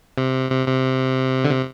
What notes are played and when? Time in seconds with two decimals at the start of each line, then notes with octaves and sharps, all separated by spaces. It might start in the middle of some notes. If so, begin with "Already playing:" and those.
0.18 C3
0.50 C3
0.67 C3
1.44 D3
1.50 C3